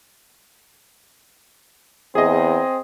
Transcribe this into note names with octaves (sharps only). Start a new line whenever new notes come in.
E2 C4 G#4 D#5